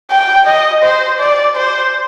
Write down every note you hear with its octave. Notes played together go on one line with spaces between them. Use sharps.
G5
D#5
C5
D5
C5